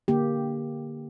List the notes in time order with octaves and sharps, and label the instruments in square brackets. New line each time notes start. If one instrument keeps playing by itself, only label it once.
[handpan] D3 A#3 G4